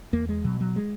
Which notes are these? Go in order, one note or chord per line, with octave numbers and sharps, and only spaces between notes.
E2 A#3
G#3
B2 F#3
F#3
G#3